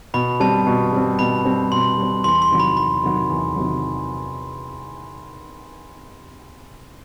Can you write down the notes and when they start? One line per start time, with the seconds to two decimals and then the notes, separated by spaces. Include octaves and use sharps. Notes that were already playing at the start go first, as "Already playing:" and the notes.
0.14 B2 B5
0.40 G3 C4 A5
0.67 B2
0.93 G3 C4
1.19 B2 B5
1.45 G3 C4
1.72 B2 C6
1.98 G3 C4
2.24 E2 C6
2.42 C6
2.51 C3 D#3 F#3
2.60 B5
2.77 E2 B5
3.03 C3 D#3 F#3
3.29 E2
3.56 C3 D#3 F#3